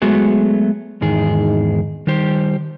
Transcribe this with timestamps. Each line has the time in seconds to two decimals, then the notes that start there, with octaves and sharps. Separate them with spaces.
0.02 F#3 G#3 A3 B3 F#4 G#4
1.01 E2 G#2 D#3 G#4
2.07 D#3 G3 G4 C5